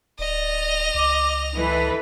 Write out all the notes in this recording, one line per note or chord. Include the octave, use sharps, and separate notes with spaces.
D1 D5 D#5 F7
C#2 D6
E3 A4 B4